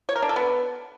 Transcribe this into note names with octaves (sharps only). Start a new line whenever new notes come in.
C#5
A#4
D4
A4
B3